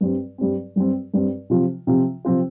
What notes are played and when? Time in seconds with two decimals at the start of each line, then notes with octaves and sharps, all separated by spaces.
0.01 G2 G3 C4
0.38 G2 G3 C4
0.76 G2 G3 C4
1.14 G2 G3 C4
1.50 C3 F3 C4 F4
1.87 C3 F3 C4 F4
2.25 C3 F3 C4 F4